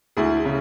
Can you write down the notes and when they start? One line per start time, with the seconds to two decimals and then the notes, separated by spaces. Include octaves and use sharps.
0.17 D2 E4 G#4
0.45 C#3